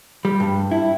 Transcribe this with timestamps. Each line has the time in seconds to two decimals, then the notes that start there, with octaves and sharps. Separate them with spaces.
0.25 G3
0.40 G2
0.71 E4